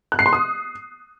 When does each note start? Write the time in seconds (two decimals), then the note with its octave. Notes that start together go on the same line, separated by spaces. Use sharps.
0.12 F#6
0.19 C7
0.26 C6
0.33 D#6